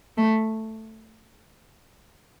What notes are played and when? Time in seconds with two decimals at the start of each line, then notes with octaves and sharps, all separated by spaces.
0.18 A3